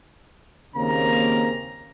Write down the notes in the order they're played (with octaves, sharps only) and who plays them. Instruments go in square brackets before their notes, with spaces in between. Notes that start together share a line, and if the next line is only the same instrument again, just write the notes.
[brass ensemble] D#2 C#3 A#3 C4 A#5